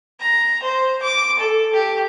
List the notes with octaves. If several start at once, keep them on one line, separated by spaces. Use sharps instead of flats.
A#5
C5
D6
A4
G4